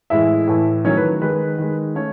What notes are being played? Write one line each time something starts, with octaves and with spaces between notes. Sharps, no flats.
A2 E3 G#3 E4 E5
A2 E3 A3
D#3 F#3 A3 C#4 C#5
B4
D#3 G#3 B4
D#3 G#3
A3 C#4 C#5